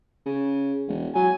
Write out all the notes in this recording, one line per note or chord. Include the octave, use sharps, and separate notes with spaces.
C#3
E1
F#3 G#5